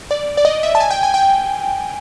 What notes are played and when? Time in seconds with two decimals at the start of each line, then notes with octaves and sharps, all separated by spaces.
0.11 D5
0.37 D5
0.45 D#5
0.63 E5
0.75 A5
0.80 G#5
0.90 G5
1.03 G#5
1.14 G5